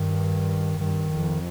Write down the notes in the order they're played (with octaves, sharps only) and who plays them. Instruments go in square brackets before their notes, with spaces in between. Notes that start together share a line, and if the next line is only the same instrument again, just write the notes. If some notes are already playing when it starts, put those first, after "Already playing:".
Already playing: [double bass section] G2 [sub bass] D#3
[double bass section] G2 [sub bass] D#3
[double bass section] F2